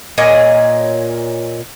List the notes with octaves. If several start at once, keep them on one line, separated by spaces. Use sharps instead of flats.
A#2 C#5 D#5 G#5